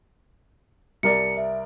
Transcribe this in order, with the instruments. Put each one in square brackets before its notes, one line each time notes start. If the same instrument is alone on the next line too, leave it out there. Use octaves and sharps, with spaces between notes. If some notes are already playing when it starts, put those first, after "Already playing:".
[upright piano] C2 A#4 D5 [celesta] C#7
[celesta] E5